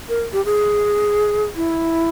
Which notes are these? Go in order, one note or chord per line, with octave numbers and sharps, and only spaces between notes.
A#4
G4
G#4
E4